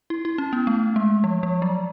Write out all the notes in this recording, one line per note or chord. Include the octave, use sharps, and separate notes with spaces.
E4
E4
C#4
B3
A3
G#3
F3
F3
F#3